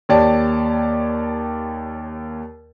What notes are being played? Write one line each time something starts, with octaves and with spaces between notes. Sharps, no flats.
D#2 G4 C#5 D5 A5